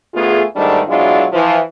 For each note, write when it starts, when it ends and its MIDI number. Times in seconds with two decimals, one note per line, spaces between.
0.15 0.43 38
0.15 0.43 57
0.15 0.43 59
0.15 0.43 65
0.15 0.43 68
0.56 0.80 40
0.56 0.80 44
0.56 0.80 51
0.56 0.80 55
0.56 0.80 57
0.56 0.80 62
0.88 1.25 47
0.88 1.25 54
0.88 1.25 56
0.88 1.25 62
0.88 1.25 64
0.88 1.25 65
1.33 1.59 52
1.33 1.59 53